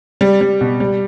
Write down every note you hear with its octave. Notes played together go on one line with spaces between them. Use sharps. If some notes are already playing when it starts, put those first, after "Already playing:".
G3
G3
B2
G3